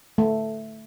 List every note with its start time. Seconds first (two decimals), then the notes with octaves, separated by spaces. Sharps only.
0.18 A3